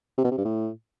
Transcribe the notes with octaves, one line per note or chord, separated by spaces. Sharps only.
C3
B2
C3
G2
A2